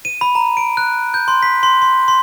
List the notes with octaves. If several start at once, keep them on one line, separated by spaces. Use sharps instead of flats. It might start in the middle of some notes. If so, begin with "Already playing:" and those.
D#7
B5
A#5
D7
F#6
G6
C6
B6
C6
C6
C6